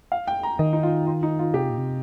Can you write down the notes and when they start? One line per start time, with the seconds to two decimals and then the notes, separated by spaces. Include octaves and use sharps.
0.12 F5
0.27 G5
0.43 A#5
0.59 D#3 D#5
0.73 D#4
0.83 F4
1.07 F4
1.23 D#4
1.39 F4
1.54 C3 G4
1.70 A#2
1.78 C3